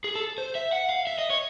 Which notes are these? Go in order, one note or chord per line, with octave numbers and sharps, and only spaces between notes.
G#4
A4
C5
E5
F#5
F5
E5
D#5
C#5